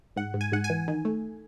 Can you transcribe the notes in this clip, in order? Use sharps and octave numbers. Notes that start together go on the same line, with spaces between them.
G#2 F#5
G#2
G#5
G#2 F#5
G#5
E3
D#3
A3